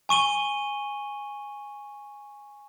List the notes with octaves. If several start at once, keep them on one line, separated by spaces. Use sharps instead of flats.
G#5 C#6 D#7 G7